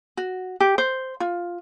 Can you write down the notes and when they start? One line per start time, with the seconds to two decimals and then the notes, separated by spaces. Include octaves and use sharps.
0.17 F#4
0.60 G4
0.78 C5
1.20 F4